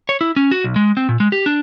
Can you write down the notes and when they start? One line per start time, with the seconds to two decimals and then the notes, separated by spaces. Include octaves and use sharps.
0.09 C#5
0.21 E4
0.36 C#4
0.51 F#4
0.64 B1
0.76 G#3
0.97 C4
1.09 A#2
1.20 G#3
1.32 G4
1.46 D4